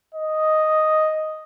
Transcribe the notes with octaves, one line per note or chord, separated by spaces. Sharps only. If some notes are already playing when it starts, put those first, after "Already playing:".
D#5